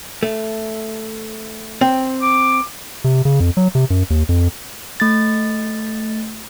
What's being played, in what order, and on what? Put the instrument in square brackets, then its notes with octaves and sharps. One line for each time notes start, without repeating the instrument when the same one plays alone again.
[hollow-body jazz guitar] A3
C4
[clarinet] D6
[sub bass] C3
C#3
F2
F#3
C3
F#2
D#2
F2
[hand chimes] A3 A6